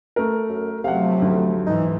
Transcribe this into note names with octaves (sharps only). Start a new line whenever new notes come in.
A3 A#4
F#2
C3 F3 F#3 A3 F5 F#5
D2
G#2 E3 D#4